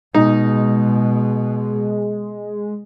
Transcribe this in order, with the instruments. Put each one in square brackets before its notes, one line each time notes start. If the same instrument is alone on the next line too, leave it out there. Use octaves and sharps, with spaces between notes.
[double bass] B2 [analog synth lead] G#3 [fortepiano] D#4